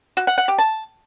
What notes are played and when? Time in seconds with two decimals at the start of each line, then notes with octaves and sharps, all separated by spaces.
0.17 F#4
0.27 F#5
0.38 F#5
0.48 G4
0.58 A5